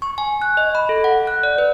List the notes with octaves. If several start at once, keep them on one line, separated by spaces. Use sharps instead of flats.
C#6
G#5
F#6
D#5
B5
A4
F#5
F#6
D5
B4